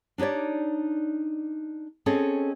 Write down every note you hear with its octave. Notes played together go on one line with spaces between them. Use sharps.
D4 D#4 G4 C#5 D5
C4 C#4 G#4 A4 C#5 D#5